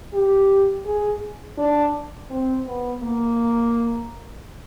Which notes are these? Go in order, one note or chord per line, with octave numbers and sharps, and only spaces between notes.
G4
G#4
D4
C4
B3
A#3